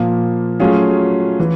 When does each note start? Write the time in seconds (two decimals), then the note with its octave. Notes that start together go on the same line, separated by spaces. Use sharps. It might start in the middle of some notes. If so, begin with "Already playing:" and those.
Already playing: A#2 F3 A#3
0.60 F#3 A3 C#4 F4 G#4
1.40 E3